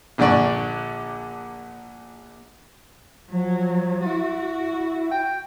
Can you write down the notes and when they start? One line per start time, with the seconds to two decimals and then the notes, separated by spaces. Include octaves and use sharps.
0.18 A#1 A#2 D3 D5 C#6
3.30 F3 F#3
4.05 E4 F#4
5.11 G5